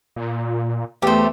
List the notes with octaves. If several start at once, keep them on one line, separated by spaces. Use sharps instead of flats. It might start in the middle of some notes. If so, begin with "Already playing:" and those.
A#2
E2 A3 G4 C5